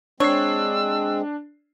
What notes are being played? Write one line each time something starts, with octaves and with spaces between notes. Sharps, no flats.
G#3 C4 D4 C#5 E6 C7